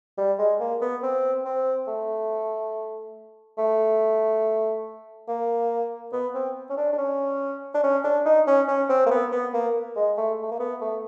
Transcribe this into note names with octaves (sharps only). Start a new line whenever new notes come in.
G3
G#3
A#3
B3
C4
C4
A3
A3
A#3
B3
C4
C#4
D4
D4
C#4
D4
C#4
D4
D#4
C#4
C#4
C4
A#3
B3
B3
A#3
G#3
A3
A3
A#3
B3
A3